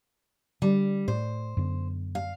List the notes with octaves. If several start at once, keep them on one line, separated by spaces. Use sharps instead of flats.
D3 G3
A2 C5
F#2 D3 B3
F5